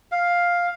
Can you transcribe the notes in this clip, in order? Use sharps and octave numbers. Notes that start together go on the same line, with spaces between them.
F5